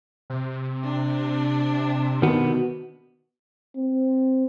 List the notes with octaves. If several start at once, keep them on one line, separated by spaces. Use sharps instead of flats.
C3
D4
B2 D#3 B3
C4